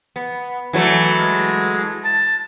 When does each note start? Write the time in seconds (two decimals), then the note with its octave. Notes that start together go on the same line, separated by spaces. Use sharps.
0.16 B3
0.73 E3 F#3 A3
1.19 G#3
2.05 A5